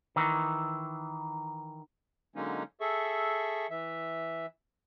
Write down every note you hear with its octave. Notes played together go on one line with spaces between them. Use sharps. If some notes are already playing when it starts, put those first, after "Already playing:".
D#3 E3
D3 F#3 G#3 A#3 C#4 D#4
G#4 A4 E5 C#6
E3 E5